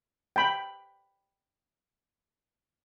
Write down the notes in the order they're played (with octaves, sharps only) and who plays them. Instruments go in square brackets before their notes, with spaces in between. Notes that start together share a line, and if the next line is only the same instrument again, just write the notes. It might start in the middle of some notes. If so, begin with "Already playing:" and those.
[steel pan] G5 B5